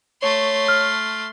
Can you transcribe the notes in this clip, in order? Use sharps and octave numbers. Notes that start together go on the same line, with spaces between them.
A3 C#5 C6
F6